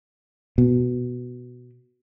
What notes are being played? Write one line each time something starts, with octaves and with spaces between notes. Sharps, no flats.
B2